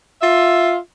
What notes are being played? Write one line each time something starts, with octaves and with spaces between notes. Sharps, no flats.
F4 E5